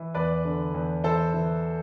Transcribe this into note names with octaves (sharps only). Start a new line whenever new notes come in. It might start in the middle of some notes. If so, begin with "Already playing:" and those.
Already playing: E3
E2 B4 D5
D3
E2
E3 A4 C5
E3